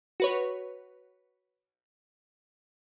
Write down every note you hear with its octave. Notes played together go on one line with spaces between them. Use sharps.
F#4 B4 C#5